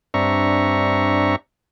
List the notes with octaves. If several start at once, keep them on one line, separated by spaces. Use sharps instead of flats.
G2 C4 D4 E5 A#5 C#6